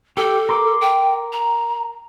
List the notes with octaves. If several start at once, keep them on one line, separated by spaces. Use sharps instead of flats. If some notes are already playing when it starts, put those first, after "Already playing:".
G4 A4
A#4 C6 D6
G5
A#5